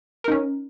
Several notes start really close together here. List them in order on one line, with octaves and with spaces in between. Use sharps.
A#4 D#4 C#4